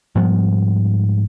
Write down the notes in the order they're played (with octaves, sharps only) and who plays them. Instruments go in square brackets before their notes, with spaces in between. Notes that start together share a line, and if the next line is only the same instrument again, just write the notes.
[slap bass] G#2 F3 G3 B3